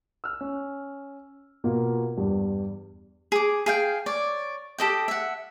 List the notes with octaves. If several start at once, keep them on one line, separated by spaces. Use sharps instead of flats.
E6 F6
C#4
B2 A#3 F4 A#4
E2 G2 G3
G#4 D6
G#4 F5 G5
C#5 D5
G4 A4 D#5 G5
E5 F#5